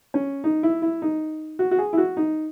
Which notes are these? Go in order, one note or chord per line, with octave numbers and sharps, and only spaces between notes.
C#4
D#4
E4
E4
D#4
F#4
F#4
G#4
E4
F#4
D#4